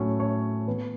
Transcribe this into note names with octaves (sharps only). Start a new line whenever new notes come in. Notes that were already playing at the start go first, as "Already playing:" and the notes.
Already playing: A2 F#3 A3 C#4 C#5
C#5
E3 B3 B4